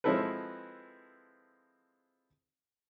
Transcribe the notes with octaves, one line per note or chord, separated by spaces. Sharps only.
F3 G#3 C4 E4 A4 B4